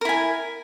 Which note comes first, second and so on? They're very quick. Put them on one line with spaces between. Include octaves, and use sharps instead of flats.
A#4 E4 G#5